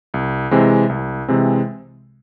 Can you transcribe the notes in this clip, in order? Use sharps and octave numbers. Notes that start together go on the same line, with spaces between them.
C2
C3 E3 G#3 C4
C2
C3 E3 G#3 C4